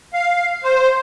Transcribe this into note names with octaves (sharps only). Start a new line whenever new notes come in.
F5
C5